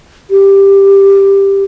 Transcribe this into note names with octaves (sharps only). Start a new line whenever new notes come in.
G4